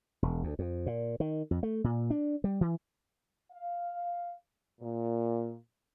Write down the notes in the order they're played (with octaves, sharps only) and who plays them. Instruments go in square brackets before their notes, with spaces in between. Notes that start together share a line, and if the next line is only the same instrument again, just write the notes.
[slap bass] E1
D2
F2
A#2
D#3
F2
A3
A#2
D4
G3
E3
[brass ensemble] F5
A#2